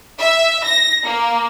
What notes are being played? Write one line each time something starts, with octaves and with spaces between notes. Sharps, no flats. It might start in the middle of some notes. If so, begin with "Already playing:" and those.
E5
A#6
A#3